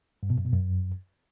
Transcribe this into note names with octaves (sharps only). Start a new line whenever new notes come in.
G2
B2
F#2
B2
F#2